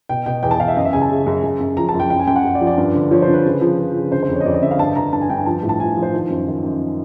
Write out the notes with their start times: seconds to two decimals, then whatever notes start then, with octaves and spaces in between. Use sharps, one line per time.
0.09 B2 G5
0.26 B2 G5
0.43 E2 G5
0.51 A5
0.60 E2 F5
0.68 E5
0.77 F#2 D#5
0.85 E5
0.93 C#3 G#5
1.01 A5
1.10 C#3
1.26 F#2
1.43 F#2
1.61 F#2
1.77 F3 A#5
1.89 A5
1.94 F#2
2.00 G5
2.10 F#2 G5
2.19 G#5
2.27 F#2 G5
2.36 F#5
2.44 F#2
2.55 D5
2.61 F3
2.67 D5
2.78 G2
2.95 D3
3.11 F3 C#5
3.22 C5
3.28 D3
3.34 B4
3.45 C#3
3.61 F3
3.79 F3
3.95 C#3
4.12 D3 C5
4.23 C5
4.29 F2
4.35 C#5
4.41 D#5
4.45 F2 D5
4.54 D#5
4.62 D3 E5
4.71 F5
4.79 G2 A5
4.96 D3 A#5
5.13 G2 A5
5.21 G#5
5.30 G2 G5
5.38 G#5
5.46 F3 A5
5.63 A2
5.69 A5
5.80 F3 G#5
5.97 F3
6.02 C5
6.13 D#3
6.30 F#2
6.47 D#3
6.64 F#2